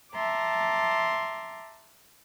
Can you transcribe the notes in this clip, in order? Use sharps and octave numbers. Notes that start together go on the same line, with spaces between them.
E5 A5 A#5 C6 D6